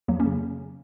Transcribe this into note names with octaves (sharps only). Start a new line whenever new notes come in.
F2 F#3 A#3
A#3 C#4
C#3